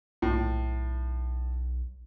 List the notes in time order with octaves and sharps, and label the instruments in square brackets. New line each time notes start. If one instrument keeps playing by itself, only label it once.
[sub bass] B1 [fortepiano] A2